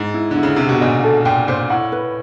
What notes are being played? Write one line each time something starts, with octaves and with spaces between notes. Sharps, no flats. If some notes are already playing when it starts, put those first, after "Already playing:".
Already playing: G#2
E4
D3
E4
C#3
C3 G4
B2
A#2 D#5
A4
A#2 G5
A#2 C5
A2 F#5
B4